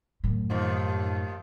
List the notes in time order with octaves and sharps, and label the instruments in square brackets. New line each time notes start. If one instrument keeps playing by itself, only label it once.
[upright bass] F#2 A2
[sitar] D#2 D#3 F3